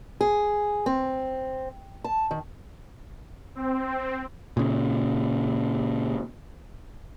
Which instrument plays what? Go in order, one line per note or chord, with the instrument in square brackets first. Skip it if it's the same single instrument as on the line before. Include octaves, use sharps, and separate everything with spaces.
[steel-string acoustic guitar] G#4
C4
A5
D#3
[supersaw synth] C4
[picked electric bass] A#2 C#3